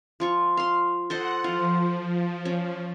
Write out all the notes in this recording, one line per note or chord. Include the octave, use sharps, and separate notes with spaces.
F3 F4 C#6
F5 C6
A4 C5 D#5 F#5
F3 F4
C#4